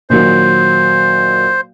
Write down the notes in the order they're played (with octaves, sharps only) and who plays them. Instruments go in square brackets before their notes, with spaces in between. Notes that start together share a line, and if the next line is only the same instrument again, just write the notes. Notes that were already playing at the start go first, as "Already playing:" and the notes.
[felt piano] A#2 D#3 F#3 [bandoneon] C5